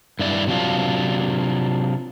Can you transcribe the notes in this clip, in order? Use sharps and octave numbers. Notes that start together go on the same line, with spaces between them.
G2 E4 D5
C3 F#3 D4 F4